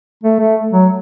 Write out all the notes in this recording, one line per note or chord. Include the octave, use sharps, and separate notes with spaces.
A3
A3
F#3